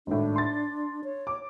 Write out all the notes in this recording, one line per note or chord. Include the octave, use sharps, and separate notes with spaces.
G#1 A2 D4
C6 A6
C#5
D6